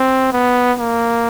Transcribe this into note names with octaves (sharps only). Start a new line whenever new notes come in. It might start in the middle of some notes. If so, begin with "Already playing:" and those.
Already playing: C4
B3
A#3